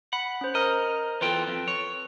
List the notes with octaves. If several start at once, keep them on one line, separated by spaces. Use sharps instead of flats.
F#5 B5
C#4 C5
A#4 D#5 A#5 F6
E2 F4 A4 B4 G5
F2
C#5